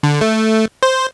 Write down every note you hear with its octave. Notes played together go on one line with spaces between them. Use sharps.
D3
A3
C5